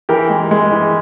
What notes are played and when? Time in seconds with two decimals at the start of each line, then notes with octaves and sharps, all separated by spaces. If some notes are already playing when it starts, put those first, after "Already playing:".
0.09 E3 G4 A#4
0.30 G#3
0.51 G#3
0.72 E3